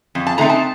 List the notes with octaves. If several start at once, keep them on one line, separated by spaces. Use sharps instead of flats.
F2
A5
D3 A3 C4 D#4 A#5
A5